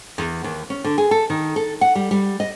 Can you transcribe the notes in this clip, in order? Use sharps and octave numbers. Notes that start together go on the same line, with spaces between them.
E2
D#2
C#4
D3
G#4
A4
D#3
A4
F#5
G3
G3
D#5